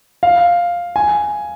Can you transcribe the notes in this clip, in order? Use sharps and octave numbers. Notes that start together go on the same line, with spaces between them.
F5
G#5